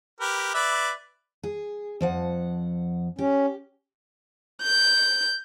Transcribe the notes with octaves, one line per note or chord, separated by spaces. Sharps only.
G4 A#4 B4
B4 D5 E5
G#4
F2 F3 F#5
C#4 G4
G6